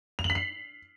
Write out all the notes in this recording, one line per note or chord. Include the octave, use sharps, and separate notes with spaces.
F7
F#7
B6
C7